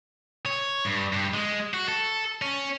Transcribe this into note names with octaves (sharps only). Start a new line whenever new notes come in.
C#5
G2
G2
G#3
F#4
A4
C#4